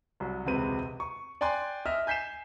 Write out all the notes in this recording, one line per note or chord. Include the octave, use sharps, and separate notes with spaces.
C2 F#3
E1 C#2 C3 C4 B4 D#7
C#6
D5 G5 G#5 C6 F#6
D#5 E5 F6
G#5 G6 B6 C7 E7